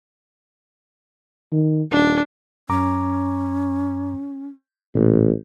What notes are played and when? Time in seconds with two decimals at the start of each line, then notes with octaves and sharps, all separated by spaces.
1.52 D#3
1.91 D#1 D4
2.69 F#2 C#4 A#5 D6
4.95 A1 A#2